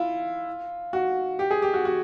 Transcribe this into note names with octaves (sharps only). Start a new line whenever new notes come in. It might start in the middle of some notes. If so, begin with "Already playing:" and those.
Already playing: E4 F4
F#4
G4
G#4
G4
F#4
F#4